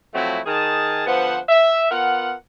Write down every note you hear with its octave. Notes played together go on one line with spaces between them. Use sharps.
F3 F#3 A3 C4 E4 F#4
D#3 G#4 A5
D3 F3 B3 C5 F#5
E5
B3 F4 A#4 F#5